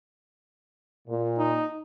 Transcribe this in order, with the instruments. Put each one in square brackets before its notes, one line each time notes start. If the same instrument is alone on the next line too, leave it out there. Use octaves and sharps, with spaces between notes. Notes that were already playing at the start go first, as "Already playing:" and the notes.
[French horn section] A#2
[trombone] D#4